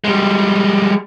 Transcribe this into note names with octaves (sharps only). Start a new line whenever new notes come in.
G3 G#3